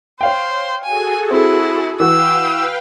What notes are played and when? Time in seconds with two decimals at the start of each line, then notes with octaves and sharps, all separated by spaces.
0.21 C5 C#5 F5 G5
0.84 F#4 G#4 A4 G#5
1.30 C4 E4
2.00 E3 F#4 B4 F5 G5 E6